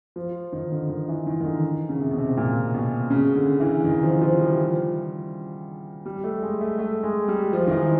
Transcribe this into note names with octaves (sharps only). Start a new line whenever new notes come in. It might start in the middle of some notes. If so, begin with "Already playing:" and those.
F3
D#3
D3
D#3
E3
D#3
D#3
D3
C#3
C3
B2
C3
A#2
B2
C#3
D3
E3
D#3
F3
F3
G3
G3
A3
G#3
A3
A3
G#3
G3
F3
D#3
E3